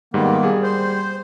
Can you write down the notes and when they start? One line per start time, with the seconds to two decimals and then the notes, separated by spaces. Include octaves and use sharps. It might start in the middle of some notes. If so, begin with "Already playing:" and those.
0.14 G#2 D#3 G3 A#3 B3
0.43 G3 G#4
0.63 C5